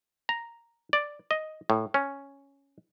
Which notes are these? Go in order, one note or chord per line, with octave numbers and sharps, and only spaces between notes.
A#5
D5
D#5
A2
C#4